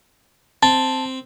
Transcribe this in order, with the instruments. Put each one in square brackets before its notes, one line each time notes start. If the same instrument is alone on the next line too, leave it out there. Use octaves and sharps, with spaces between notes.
[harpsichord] C4 [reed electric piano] A5